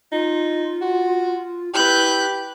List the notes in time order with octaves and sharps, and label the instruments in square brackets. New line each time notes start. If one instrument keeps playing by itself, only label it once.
[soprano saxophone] D#4 [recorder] F4
[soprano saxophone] F#4
[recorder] E4 [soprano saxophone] G4 [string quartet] B4 F#6 G6